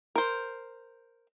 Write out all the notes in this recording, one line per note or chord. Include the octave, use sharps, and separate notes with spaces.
A#4 C5